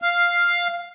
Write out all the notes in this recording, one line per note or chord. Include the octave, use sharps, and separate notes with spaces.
F5